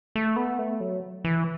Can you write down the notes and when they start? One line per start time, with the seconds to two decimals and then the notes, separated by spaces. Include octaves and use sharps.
0.16 A3
0.36 B3
0.59 A3
0.81 F#3
1.24 E3